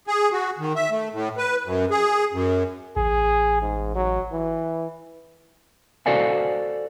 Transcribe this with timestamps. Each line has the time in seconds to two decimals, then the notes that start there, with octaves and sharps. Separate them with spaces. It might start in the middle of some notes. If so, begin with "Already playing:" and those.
0.07 G#4
0.32 F#4
0.59 D#3
0.76 E5
0.90 A3
1.13 A2
1.37 B4
1.65 F#2
1.90 G#4
2.33 F#2
2.97 A1 G#4
3.62 G#2
3.95 F#3
4.32 E3
6.06 F#4 A4 C5 D5 F5 G#5